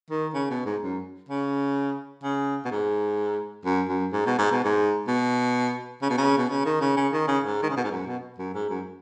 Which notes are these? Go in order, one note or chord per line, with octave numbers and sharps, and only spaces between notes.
D#3
C#3
B2
G#2
F#2
C#3
C#3
B2
G#2
F#2
F#2
G#2
B2
G#2
B2
G#2
B2
C#3
B2
C#3
B2
C#3
D#3
C#3
C#3
D#3
C#3
G#2
D#3
C#3
B2
G#2
F#2
B2
F#2
G#2
F#2